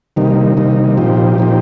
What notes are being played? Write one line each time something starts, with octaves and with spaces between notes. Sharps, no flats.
C3 D#3 G3 A#3 D#4
C3 D#3 G3 A#3 D#4
A#2 F3 C4 D#4 G4
A#2 F3 C4 D#4 G4